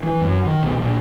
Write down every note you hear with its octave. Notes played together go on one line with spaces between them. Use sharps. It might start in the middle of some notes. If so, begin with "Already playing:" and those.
E3
F#2
D#3
B1
A#1